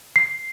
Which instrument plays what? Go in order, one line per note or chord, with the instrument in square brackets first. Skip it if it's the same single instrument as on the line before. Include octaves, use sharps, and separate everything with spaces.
[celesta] C7